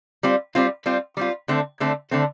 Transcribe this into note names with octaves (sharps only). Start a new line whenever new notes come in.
G3 C4 F4
G3 C4 F4
G3 C4 F4
G3 C4 F4
D3 A3 C4
D3 A3 C4
D3 A3 C4